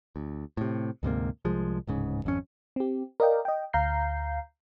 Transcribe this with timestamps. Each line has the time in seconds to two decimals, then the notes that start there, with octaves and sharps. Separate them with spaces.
0.16 D2
0.57 A2 C3
1.03 D2 G#2 C3 A#3
1.45 C2 F3 G#3
1.87 D1 G#2 C#3
2.24 G#1 F2 C#4
2.76 C4 G4
3.20 A#4 D5 D#5 F5 G5
3.45 D#5 G5
3.73 D2 F5 A#5 G6 C7